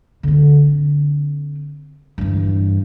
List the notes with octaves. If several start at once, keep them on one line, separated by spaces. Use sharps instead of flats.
D3 C4
G2 E3